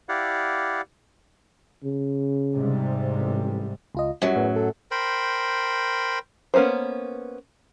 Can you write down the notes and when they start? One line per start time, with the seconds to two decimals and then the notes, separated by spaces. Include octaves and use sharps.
0.09 E4 G4 D5 F5 F#5
1.83 C#3
2.55 G#2 C3 G3
3.16 A1
3.95 C#2 F4 D#5
4.22 F#2 F#3 G3
4.36 E2 A2
4.56 A4
4.91 A#4 C5 G5 B5
6.54 A#3 B3 C#4 F#4 C5